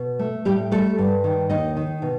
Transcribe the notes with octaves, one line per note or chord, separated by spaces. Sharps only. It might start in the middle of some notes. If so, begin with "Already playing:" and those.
Already playing: B2
A3
A2 G3 G4
G3 A3 A4
G2
D#3
D#2 D#4 D#5
D#3
B2